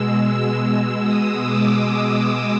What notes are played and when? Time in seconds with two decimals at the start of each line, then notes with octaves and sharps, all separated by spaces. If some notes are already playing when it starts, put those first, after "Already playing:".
Already playing: B2 G#3 E6
0.17 E6
0.59 E6
1.02 D#6
1.44 D6
1.86 D#6